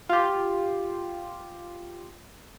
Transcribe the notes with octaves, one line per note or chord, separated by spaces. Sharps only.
F4 G4